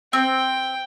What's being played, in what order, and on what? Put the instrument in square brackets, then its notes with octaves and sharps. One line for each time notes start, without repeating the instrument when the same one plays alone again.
[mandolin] C4 [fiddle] G5